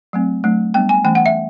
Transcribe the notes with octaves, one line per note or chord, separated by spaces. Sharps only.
F#3 A3 C4
F#3 A3 D4
G3 B3 D4 G5
G#5
E3 A3 C#4 G5
F#5
E5